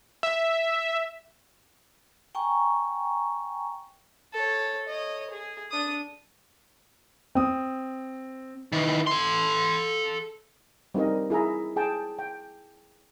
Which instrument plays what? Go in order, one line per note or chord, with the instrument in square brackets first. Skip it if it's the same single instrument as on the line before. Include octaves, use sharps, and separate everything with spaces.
[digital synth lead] E5
[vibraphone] G5 G#5 A#5 C#6
[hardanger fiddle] A4 C#5
C#5 D#5
G#4
D4 D#6
[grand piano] C4 D#6
[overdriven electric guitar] D#3 E3
A4 C6
[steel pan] G3 C4 D#4 A#4 D#5
E4 G#4 E5 A#5
G#4 G5 A5
G5